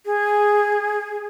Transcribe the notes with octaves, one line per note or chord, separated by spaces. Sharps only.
G#4